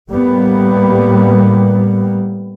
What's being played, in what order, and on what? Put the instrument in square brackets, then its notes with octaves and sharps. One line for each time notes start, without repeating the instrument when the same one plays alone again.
[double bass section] A2 G3 A#3 B3